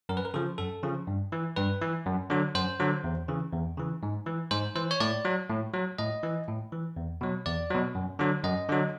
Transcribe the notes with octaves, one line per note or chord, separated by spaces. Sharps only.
F#2 A#4
B4
A#4
C#3 F3 A4
F#2 A4
C#3 F3
G2
E3
G2 B4
E3
F#2
D3 F#3
F#2 C5
D3 F#3
E2
C#3 E3
E2
C#3 E3
G#2
E3
G#2 C5
E3 C5
C#5
A2 D5
F#3
A2
F#3
A2 D#5
E3
A2
E3
E2
B2 F#3
E2 D5
B2 F#3
F#2
D3 F#3
F#2 D#5
D3 F#3